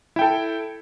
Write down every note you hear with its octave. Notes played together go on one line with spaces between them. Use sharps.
E4 A4 G5